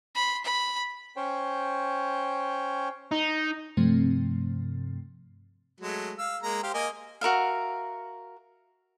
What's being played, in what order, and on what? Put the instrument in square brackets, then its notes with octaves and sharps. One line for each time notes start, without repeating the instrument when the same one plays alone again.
[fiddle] B5 C6
B5
[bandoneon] C#4 C5 C#5 G5
[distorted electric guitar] D#4
[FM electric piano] G2 C3 F3 A3 C4
[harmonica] F#3 G#3 A3
F5 E6
G#3 A#3 A#5
G4 C5 F5
A#3 D#5 G#5
[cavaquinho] F#4 A#4 E5 F5